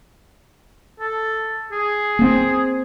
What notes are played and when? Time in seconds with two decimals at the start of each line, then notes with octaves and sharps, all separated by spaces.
1.00 A4
1.72 G#4
2.19 A#3 C4